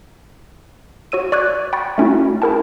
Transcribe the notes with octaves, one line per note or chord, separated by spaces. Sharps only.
F#4 C#5 E6 D#7
D5 C#6 D6 F#6 G#6
G5 B5 C#6 A6
A3 C#4 E4 F#4
E4 G#4 A#4 G5 A5